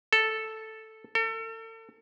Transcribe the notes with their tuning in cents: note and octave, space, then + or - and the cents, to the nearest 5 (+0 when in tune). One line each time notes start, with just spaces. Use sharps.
A4 +0
A4 +40